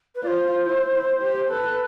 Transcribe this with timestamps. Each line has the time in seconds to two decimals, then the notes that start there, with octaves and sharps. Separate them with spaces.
0.15 B4
0.23 F4 D5
0.27 C5
0.66 E4
0.94 E4
1.22 G4
1.50 A4 B4